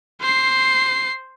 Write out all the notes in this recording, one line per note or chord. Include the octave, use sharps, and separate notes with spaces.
C5 C7